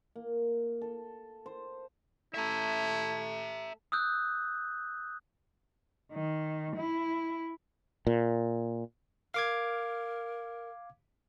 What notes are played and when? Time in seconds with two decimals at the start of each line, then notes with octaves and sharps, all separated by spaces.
0.16 A#3
0.81 A4
1.46 C5
2.34 A3 E4 E5 A#5
3.92 D#6 E6 F#6 G6
6.13 D#3
6.77 E4
8.07 A#2
9.34 A#4 F5 D6 G#6